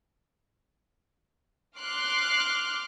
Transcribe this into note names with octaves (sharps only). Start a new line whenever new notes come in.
C6 D6 F6 F#6